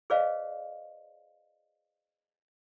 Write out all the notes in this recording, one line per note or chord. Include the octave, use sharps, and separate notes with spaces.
G#4 B4 C5 D5 D#5 F5